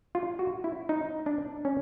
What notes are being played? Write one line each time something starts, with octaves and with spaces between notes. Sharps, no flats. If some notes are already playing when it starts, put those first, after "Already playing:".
F4
F#4
E4
D#4
D4
C#4